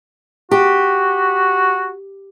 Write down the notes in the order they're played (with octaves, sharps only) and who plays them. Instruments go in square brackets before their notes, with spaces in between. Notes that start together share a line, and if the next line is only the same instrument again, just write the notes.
[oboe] F#4 [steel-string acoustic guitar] G4